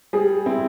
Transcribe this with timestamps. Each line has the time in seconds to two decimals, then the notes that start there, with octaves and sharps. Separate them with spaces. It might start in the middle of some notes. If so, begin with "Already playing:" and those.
0.13 G3 G#4
0.46 C4 E4